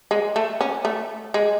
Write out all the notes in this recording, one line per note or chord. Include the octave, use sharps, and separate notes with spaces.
G#3
A3
C#4
A3
G#3